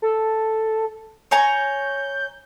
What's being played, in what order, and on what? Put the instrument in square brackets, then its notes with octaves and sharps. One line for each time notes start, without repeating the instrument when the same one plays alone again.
[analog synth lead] A4
[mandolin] C#5 G#5 A#5 [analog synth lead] G6